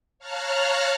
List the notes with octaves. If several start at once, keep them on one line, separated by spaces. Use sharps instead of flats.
C#5 F5 A5 A#5 F6 F#6